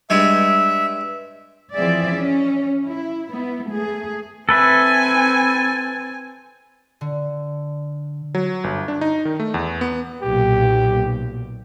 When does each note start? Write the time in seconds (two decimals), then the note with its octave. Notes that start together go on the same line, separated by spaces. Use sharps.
0.10 G2 G3 G#3 E5
1.73 E3 F3 C4 G#4 D5 E5
2.13 C#4
2.87 E4
3.31 B3 E4
3.68 A3 G#4
4.49 C4 A4 B4 E5 G#5
7.01 D3
8.35 F#3
8.64 G1
8.88 D4
9.01 D#4
9.25 D#3
9.40 A3
9.54 E2
9.81 B3
10.22 B1 A#2 G4